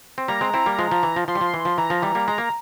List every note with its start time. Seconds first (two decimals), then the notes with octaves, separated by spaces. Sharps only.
0.18 C4
0.28 G3 A#3 A#5
0.41 G#3 C4
0.54 C4 E4
0.66 G3 A#3
0.79 F3 G#3
0.91 F3
1.03 E3
1.16 F3
1.28 F3 C6
1.35 G3
1.41 F3
1.54 E3
1.65 F3
1.78 E3 A#5
1.90 F3
2.02 E3 G3
2.15 G3 A#3
2.28 G#3 A#5
2.38 A#3